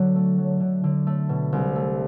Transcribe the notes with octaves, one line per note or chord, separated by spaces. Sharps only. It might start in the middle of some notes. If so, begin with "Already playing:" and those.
Already playing: D3 F#3
A3
F#3
D3
D3
A3
B2
C2
A3